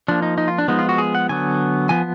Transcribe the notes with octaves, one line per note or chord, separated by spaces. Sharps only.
F3 A#3 D4
D#4
D#4
F4
D4
F3 G#3 B3 D#4
F4
F#4
G#4
F#5
D3 F#3 B3 G#5
F3 B3 G#5